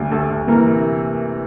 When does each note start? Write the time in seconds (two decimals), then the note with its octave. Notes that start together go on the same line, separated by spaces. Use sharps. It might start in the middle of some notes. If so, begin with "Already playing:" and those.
Already playing: D2 G3 A3 A4
0.11 D2 A3 A4
0.29 D2
0.47 E3 A#3 A#4
0.66 C3